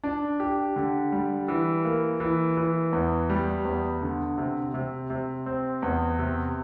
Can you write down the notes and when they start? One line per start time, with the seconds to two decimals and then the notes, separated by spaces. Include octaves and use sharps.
0.04 D4
0.40 G4
0.76 D3
1.12 G3
1.48 E3
1.85 A#3
2.20 E3
2.57 E3
2.93 E2
3.30 G3
3.65 E2
4.02 D3
4.38 C3
4.74 C3
5.10 C3
5.46 C4
5.82 E2
6.18 C3